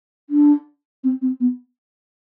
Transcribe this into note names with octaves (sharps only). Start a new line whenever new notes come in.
D4
C4
C4
B3